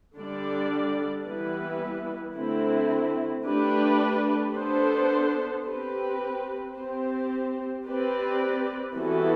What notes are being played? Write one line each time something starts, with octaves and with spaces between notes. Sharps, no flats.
D3 G3 D4 A4 D5
E3 G3 B3 E4 B4
D3 A3 C4 E4
A3 D4 G4 B4
B3 D4 A4 C5
C4 G4 B4
C4 G4 C5
C4 G4 B4 D5
E3 G3 B3 F#4 A4